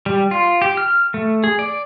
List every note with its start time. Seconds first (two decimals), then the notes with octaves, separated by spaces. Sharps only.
0.06 G3
0.31 F4
0.62 G4
0.77 F6
1.14 A3
1.44 G#4
1.59 D5